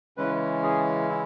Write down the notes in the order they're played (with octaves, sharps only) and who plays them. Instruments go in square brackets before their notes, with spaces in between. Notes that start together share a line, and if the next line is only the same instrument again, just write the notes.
[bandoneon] C#3 E3 G#3 C#4 B4
G#4
E4